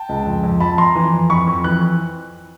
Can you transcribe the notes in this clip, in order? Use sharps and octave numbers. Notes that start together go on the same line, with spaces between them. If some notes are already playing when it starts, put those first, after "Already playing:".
Already playing: G5 A5
C#2
F2
F2
F2 A5 B5
F2 A#5 C6
E3
F2
F2 B5 C#6
F2
E3 F#6